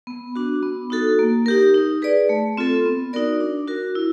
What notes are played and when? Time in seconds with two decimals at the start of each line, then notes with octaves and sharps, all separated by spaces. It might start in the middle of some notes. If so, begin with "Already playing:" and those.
0.07 B3
0.36 D4 F#4
0.62 B3
0.90 D#4 F#4 A4
1.19 A#3
1.46 D#4 G4 A#4
1.74 D#4
2.02 G#4 B4 D5
2.29 A3
2.57 C4 F4 A4
2.85 B3
3.13 D#4 F#4 A#4 D5
3.41 D4
3.68 F#4 A#4
3.95 E4